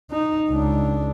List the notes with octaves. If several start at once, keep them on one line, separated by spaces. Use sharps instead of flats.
D#4
C#2 D4